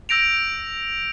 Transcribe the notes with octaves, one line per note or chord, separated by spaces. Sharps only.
E6 G6 A#6 D7 F7